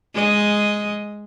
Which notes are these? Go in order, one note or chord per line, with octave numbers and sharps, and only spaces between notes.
G#3 D#5